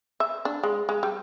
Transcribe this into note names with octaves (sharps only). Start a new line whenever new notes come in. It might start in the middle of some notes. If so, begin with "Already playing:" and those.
E5
D4
G#3
G#3
G3